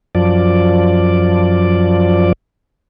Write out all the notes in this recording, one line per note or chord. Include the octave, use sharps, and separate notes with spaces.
F#2 F3 D5